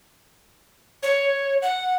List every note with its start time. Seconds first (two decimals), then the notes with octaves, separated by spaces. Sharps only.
1.03 C#5
1.62 F#5